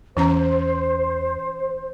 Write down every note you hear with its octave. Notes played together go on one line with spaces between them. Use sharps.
E2 E3 C#4 C5 A#5